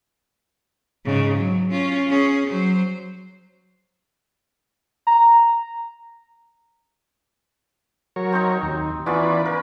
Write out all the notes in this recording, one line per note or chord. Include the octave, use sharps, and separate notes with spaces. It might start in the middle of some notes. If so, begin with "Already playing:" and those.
G#2 C#3
F#3
C#4 F4
C#4 G#4
F#3 C5
A#5
F#3 A#4 C#5
C4 D#4
D#2
E3 B3 C#4 F4 B4 D5
A#4 B4